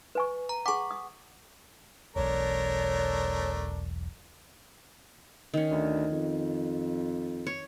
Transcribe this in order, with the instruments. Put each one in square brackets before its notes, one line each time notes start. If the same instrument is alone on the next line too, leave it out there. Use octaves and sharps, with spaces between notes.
[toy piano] B4 G#5 C#6
[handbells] A#5
[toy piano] G#4 G#5 D6 [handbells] F#5 C#6
[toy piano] D#6
[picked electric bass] E1 B1 E2 [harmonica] A3 D4 A#4 [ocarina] C#5
[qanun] D#3 C#4
[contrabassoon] D2
F2
[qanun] C#5